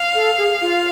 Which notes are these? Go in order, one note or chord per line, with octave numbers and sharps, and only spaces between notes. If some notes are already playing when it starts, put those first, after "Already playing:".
Already playing: F5
A4
G#4
F4